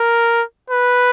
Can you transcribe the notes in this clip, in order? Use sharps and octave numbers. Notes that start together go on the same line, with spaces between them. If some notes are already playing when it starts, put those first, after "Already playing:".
Already playing: A#4
B4